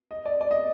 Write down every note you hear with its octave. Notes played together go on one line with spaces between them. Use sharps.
D#5
D5
D5
D#5